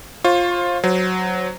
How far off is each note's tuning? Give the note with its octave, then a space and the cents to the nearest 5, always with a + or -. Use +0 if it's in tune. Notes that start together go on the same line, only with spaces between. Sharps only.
F4 +10 C5 +35 C#6 +0
F#3 +0 C5 -15